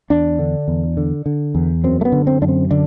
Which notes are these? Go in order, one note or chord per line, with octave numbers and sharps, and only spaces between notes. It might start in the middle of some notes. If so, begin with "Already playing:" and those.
E2 D4
D3
E2
D3
D3
E2
F#2 C4
A3
B3
D3
C4
F#2 D4
C4
D3 D4